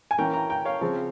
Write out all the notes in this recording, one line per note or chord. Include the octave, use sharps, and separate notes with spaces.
G#5
E3 A#3 C#4 G5 A#5
G5 A#5
G5 A#5
C#5 F5
C#3 F3 C4